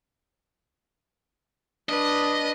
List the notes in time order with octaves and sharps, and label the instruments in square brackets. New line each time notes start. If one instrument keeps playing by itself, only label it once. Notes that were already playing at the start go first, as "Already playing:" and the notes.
[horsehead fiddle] D4 B4 [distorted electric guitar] D#5